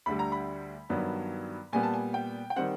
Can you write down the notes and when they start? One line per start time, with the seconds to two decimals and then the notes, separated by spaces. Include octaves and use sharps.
0.06 D2 D3 G3 B5
0.19 A#5
0.32 B5
0.89 G2 D#3 F#3 B3 D4
1.73 A#2 G3 B3 G#5
1.83 A5
1.94 G#5
2.14 G5
2.50 G5
2.56 D#3 G3 C4 F#5